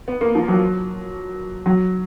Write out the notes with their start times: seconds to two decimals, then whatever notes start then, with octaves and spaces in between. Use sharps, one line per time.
0.08 B3
0.21 A#3
0.35 F3
0.48 F#3
1.66 F#3